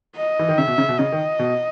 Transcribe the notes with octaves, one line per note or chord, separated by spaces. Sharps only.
D#5
E3
D#3
C#3 E5
B2
C#3
B2
C#3 D#5
D#3
B2